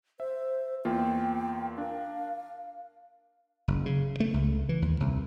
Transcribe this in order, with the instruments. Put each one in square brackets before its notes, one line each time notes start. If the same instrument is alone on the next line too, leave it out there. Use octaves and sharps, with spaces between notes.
[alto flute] C5 [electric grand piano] E5
[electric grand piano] E2 A#3 F4 [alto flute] G5
[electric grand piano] D4 A#4 [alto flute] F5
[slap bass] F#1
C#3
A3
C#2
E3
D#2
C2